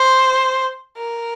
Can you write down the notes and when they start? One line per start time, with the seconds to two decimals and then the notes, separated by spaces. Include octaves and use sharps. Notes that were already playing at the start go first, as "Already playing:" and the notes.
Already playing: C5
0.97 A#4